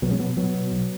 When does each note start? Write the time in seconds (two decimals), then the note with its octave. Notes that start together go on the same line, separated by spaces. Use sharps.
0.02 B1 F#3 B3
0.11 G#3 C#4
0.19 B2 F#3 B3
0.37 B1 F#3 B3
0.54 B2
0.71 B1